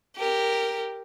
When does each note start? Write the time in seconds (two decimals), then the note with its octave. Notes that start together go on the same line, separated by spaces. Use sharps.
0.16 G4 A#4